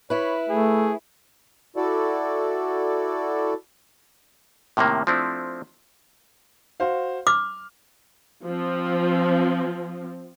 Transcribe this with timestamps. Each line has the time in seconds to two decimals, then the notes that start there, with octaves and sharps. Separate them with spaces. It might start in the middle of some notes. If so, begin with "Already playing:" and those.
0.10 E4 B4 C#5
0.50 A3 G#4
1.76 E4 F#4 A4 D5
4.77 A2 C3 D#3 A#3
5.07 F3 A3 C4 D4 E4
6.80 F#4 C5 F5
7.27 D6 F6
8.45 F3 C4